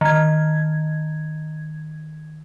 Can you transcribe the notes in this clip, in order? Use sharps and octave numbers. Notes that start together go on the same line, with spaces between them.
D#3 G#6